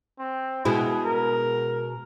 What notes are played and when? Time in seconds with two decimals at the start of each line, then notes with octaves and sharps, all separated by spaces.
0.19 C4
0.65 B2 G#3 E4 G#4
1.05 A#4